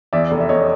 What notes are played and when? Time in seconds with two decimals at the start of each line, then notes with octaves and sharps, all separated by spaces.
0.13 E2 D5 E5
0.31 F1
0.40 E5
0.49 F1 C#5 D#5